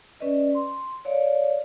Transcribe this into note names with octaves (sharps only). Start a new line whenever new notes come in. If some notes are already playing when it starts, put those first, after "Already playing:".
C#4 B4 D5 D#5
C6
C#5 D5 F5